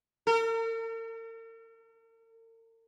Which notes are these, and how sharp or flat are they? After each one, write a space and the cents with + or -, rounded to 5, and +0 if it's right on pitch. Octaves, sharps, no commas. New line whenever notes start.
A#4 -45